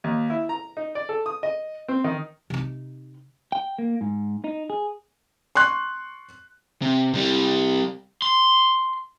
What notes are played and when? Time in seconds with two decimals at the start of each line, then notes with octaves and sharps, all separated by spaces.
0.04 D#2
0.30 E4
0.49 A#5
0.77 D#4
0.95 D5
1.09 A4
1.26 D#6
1.43 D#5
1.88 C4
2.04 D#3
2.50 C3 D#4
3.52 G5
3.78 A#3
4.01 G#2
4.44 D#4
4.70 G#4
5.55 C6 C#6 F#6
6.82 C3
7.14 C3 G3
8.22 C6